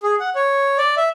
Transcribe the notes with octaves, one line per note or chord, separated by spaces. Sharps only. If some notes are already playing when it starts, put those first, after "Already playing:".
G#4
F#5
C#5
D5
E5